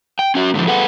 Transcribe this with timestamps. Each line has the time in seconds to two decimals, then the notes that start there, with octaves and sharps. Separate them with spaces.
0.19 G5
0.35 C#4 F#4
0.54 G#2 D3 E3 F3
0.67 G#4 A4 B4 F#5